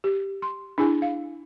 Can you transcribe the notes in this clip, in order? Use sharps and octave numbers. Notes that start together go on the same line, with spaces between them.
G4
C6
D4 E4 G#4 G#5
F5